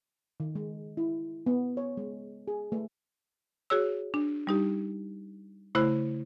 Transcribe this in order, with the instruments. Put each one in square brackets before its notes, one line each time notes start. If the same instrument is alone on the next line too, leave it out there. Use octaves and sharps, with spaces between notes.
[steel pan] D#3
G#3
E4
B3
C#5
G#3
G#4
A3
[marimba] F#4 G#4 C#5 E6
D4
G3 D#4 G4
C#3 A3 E4 C5 B5 F#6